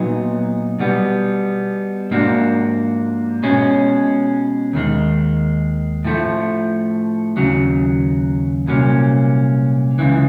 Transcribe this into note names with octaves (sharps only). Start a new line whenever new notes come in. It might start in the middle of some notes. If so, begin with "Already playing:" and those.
Already playing: A#2 F#3 B3 D#4
B2 G3 B3
G#2 F3 A#3 D4 F#4
B2 G#3 C#4
D#2 D#3 G#3
A2 F3 A3
D#2 C#3 F#3
C2 A#2 F#3 A#3 C#4
C#2 C#3 E3